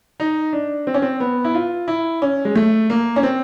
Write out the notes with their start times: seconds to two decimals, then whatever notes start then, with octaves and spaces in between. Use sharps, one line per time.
0.20 D#4
0.53 D4
0.87 C4
0.94 C#4
1.02 C4
1.20 B3
1.44 E4
1.55 F4
1.88 E4
2.22 C#4
2.45 G#3
2.55 A3
2.90 A#3
3.16 C#4
3.23 C4